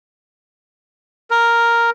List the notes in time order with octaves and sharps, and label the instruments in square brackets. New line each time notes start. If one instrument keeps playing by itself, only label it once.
[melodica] A#4